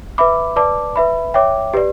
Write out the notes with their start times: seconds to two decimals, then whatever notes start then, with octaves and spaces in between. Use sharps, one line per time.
0.18 B4 E5 B5 D6
0.56 B4 D5 A5 D6
0.96 B4 E5 B5
1.34 C#5 E5 G5 D6
1.74 G4 B4 D5